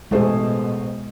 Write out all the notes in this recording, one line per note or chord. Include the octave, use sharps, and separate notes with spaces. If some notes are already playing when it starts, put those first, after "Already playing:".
A1 B2 G#3 A3 G#4 C5